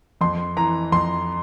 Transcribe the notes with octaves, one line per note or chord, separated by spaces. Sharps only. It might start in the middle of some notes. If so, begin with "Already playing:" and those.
F2 C6
E3 A#5
F2 C6